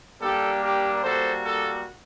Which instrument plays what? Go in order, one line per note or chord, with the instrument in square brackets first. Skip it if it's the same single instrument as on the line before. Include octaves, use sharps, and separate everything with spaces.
[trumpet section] G3 A#3 D4 G4 A4
G4 A#4
G3 A#3 F#4 A4 C5
A4